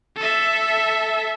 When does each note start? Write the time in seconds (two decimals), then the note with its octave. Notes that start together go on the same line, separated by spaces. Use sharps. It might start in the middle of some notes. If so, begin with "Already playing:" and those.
0.17 A4 E5